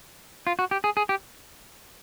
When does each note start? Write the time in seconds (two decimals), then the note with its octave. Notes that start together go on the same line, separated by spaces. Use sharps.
0.47 F4
0.59 F#4
0.71 G4
0.84 G#4
0.97 G#4
1.09 G4